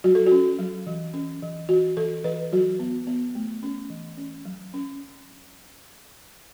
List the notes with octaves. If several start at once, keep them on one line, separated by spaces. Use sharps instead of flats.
F#3 F#4
A4
F#4
C#4
F#3
E3
C#4
E3
E3 F#4
E3 A4
E3 B4
F#3 F#4
B3
B3
A3
C#4
E3
C#4
F#3
C#4